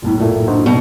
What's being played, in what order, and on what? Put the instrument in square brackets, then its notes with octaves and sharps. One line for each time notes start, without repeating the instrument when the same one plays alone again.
[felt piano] F#1 B1 A2
[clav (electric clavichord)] A#2 A3
[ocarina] D4 [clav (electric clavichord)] D#4 F#4 C5
[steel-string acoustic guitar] B2 [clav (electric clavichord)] G3 [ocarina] B3